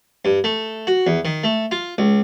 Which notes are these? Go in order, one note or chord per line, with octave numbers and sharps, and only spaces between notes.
G2
A3
F#4
E2
D#3
A3
F4
C#2